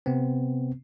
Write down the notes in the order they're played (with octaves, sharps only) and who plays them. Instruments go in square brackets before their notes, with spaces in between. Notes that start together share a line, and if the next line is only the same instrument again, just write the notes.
[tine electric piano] C3 B3 C4